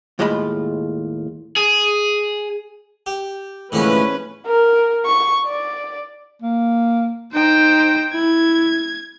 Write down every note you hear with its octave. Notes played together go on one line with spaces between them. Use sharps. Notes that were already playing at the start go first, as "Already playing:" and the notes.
D#2 A2 G#3 F4 D#5 B5
G#4
G4
A2 D3 E3 F3 G#3 C#4 D4 B4
A#4
C#6
D5
A#3
D#4 C5 G5
E4 G#6